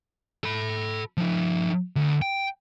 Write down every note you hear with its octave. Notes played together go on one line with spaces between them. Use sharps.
A4 B5
F3 D#4
D2
G5